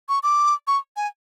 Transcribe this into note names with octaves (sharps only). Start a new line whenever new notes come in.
C#6
D6
C#6
G#5